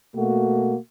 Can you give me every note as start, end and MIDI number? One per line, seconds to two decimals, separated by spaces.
0.16 0.75 47
0.16 0.75 57
0.16 0.75 58
0.16 0.75 66